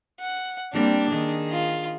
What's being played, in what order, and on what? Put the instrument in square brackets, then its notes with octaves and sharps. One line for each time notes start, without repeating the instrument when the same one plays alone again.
[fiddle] F#5
[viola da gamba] G3 A#3 C4 [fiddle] D4
[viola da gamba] D#3 G#4
[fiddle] F4